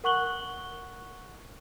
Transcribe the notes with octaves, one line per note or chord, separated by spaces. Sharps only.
A#4 F#5 C#6 F#6 F#7 G7